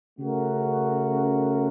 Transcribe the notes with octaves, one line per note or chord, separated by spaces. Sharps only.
C#3 A3 C#4 F#4 A#4